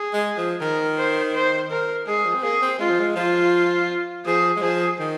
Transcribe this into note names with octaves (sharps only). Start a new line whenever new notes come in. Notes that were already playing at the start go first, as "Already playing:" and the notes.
Already playing: G#4
G#3
F3
D#3 A#4
C5
C5
A#4
G#3 G#4
G#3
F3
C4
A#3 G#4
C4
G#3 F4
F3
G#3
F3 F4
F3 G#4
G#3
F3 G#4
D#3